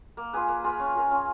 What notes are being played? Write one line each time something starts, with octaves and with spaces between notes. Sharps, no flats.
A#3
F4 G#4 B4
A#3
F4 G#4 B4
C#4
F4 A#4
C#4